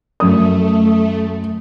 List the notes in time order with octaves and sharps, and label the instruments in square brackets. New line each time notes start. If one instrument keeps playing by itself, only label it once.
[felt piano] F#2 D#6 [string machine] A3